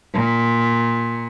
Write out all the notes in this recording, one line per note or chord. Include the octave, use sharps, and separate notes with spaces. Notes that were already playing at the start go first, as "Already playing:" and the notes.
A#2